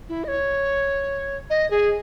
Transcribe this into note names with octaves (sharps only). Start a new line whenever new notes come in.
E4
D#5
C#5
D#5
G#4